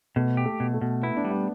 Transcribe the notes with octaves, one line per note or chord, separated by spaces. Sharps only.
B2 A3
G4
A3
B2
A3
B2
B3 E4
D4
G3
B3